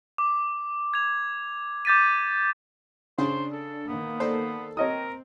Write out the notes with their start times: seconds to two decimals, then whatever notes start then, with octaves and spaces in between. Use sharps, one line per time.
0.18 D6
0.94 G#6 F7
1.85 D6 G6 A6 B6 D#7
3.18 C#3 D4 C5
3.52 A4
3.88 D#3 A#3 B3
4.20 A4 C5 D5
4.77 C4 A#4 C#5 D#5 D#6